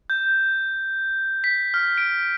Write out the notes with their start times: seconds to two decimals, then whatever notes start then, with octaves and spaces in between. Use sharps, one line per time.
0.10 G6
1.44 B6
1.74 F6
1.98 D7